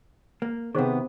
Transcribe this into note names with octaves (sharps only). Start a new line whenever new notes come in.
A#3
C3 D#3 B3 G#4 C5 F5